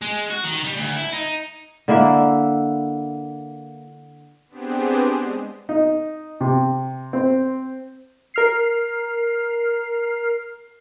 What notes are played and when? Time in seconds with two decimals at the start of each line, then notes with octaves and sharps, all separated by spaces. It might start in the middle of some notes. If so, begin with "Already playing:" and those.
0.02 G#3
0.31 F#4
0.45 D#3
0.64 G3
0.77 D2
0.96 E4
1.13 D#4
1.88 D3 A#3 E4 E5
4.49 B3 C4 D4 G4 G#4 C5
5.07 G#3
5.69 D#4
6.41 C3
7.13 C4
8.34 A#4 F6 C7